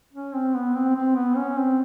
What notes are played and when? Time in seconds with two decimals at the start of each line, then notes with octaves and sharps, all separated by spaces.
0.13 C#4
0.33 C4
0.55 B3
0.75 C4
0.96 C4
1.16 B3
1.37 C#4
1.57 C4